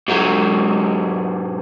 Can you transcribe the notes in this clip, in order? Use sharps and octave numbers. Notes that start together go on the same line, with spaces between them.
G#2 F#3